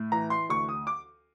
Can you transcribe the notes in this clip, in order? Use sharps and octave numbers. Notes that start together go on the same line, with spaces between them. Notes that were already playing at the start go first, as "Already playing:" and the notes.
Already playing: A2
E3 A#5
C6
D2 C#6
D#6
D6